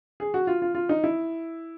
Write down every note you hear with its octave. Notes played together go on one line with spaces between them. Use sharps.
G#4
F#4
F4
F4
F4
D#4
E4